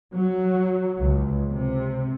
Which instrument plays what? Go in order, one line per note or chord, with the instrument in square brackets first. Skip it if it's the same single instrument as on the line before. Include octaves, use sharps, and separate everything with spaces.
[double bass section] F#3
C#2
C3